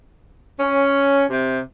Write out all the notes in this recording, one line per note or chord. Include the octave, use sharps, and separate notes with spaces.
C#4
C3